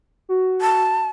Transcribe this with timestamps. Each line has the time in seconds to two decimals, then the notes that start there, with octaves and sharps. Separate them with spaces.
0.29 F#4
0.61 A5